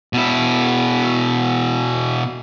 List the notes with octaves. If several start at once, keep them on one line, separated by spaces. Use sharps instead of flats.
B2 E4